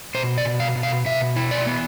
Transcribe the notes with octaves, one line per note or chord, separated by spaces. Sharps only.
B2 C5
D5
B2
F5
B2
F5
B2 E5
E4
D5
B3